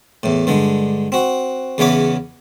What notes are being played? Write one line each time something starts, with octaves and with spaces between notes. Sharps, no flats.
E2 A2
G2 D3 G#3
C4 F#4
E2 C#3 E3 B3 C#5 D6